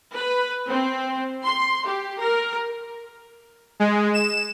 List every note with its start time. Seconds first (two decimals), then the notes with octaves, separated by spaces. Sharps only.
0.13 B4
0.69 C4
1.44 C6
1.86 G4
2.20 A#4
3.80 G#3
4.14 E7